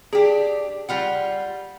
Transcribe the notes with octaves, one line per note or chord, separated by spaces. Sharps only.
D4 G4 G#4
G3 F4 F#5